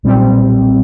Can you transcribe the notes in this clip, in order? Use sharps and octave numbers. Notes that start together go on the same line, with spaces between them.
B1 A#2 G3 C4